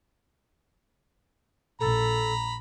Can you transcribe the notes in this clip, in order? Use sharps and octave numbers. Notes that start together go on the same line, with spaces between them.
A#1 A4 A#5 B5